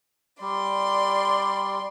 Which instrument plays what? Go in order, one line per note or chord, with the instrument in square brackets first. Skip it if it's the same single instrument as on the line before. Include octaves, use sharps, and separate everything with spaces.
[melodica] G3 [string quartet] D5 C6